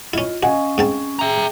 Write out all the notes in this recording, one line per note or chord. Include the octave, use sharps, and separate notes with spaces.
C#4 E4 F4 D#5
C#4 F#4 D#5 F5 G#5 C#6
G#2 C4 A5
G#4 E5 G5 A#5